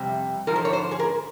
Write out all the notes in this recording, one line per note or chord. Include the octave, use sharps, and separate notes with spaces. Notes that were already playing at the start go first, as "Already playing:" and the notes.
Already playing: F2 C3 G3
G#2 F3 A#4
C5
C#5
C5
G#4
A#4